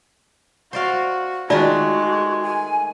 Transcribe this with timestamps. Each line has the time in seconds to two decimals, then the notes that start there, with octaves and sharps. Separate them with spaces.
0.73 F#4 C5 D5 F5
1.50 D#3 G#3 A3 F4 F#4 D5
2.42 G#5